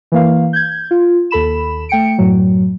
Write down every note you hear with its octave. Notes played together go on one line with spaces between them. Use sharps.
E3 A#3 F5
G6 G#6
F4
D#2 A4 B5 E7
A3 G5 C#7 D7
F#2 A2 F#3